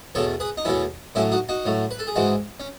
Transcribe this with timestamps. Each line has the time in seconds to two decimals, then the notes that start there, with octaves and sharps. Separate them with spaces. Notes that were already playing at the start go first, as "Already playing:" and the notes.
0.15 E2 B2 A3 A4 C#5
0.40 G#4 B4
0.57 D#4
0.65 E2 B2 A3 C#4 E4
1.15 A2 F#3 A3 C#4 E4
1.32 D#4 F#4
1.49 D#4 F#4
1.66 A2 F#3 A3
1.91 B4
1.99 A4
2.07 G#4
2.16 G#2 E3 G#3 D#4 F#4
2.60 C#4